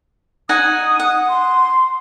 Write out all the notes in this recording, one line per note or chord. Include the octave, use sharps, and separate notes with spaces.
D#4 F#5 G#5 D#6
F#5
C6